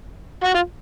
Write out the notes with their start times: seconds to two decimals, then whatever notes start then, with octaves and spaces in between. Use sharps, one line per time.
0.44 F#4
0.54 F4